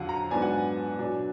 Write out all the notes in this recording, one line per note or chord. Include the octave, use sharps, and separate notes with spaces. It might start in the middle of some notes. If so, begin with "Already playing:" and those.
Already playing: F2 D3 F#3 F5 F#5
A#5
G#2 F#3 B3 D4 G#5
F#5
G#5
B2 F#3 D4